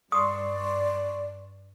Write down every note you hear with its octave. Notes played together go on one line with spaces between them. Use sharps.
G2 D5 C6 C#6 D#6